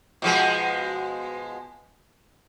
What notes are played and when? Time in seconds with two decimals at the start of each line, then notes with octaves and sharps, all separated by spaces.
0.22 B2 F3 G#3